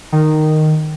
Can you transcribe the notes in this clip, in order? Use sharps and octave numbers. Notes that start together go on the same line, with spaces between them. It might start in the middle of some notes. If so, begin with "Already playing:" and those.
D#3